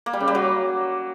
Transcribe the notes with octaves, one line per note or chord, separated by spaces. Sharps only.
A#3
G3
C#3
G3
F#3